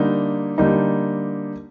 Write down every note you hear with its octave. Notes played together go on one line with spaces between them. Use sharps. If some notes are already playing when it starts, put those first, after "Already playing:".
Already playing: D3 G3 A#3 D#4
D3 G3 A#3 D#4